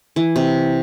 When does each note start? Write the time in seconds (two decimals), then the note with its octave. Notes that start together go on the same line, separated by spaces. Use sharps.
0.16 E3
0.36 C3